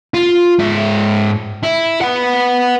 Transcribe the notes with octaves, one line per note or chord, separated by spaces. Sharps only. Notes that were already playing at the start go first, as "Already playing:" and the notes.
F4
G#2 E5
E4
B4 F#5